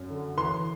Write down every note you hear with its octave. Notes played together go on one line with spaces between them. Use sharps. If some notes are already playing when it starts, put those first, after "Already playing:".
Already playing: F#2
D3
E3 C6